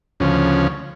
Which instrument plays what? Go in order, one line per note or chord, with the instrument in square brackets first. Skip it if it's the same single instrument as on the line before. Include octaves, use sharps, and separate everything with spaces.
[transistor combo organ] D2 C#3 F3 C#4